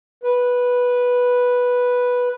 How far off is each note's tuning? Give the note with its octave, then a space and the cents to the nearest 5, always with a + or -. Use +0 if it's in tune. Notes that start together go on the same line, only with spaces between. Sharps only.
B4 -5